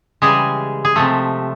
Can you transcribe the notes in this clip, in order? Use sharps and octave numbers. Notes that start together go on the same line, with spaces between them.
C#3 E3 G3 G#3 G#4
G#4
C3 F3 G#3 A3 A4